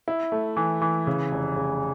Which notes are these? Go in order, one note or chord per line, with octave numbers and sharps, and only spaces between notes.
E4
A3
E3
E3
C#3
F1
C#3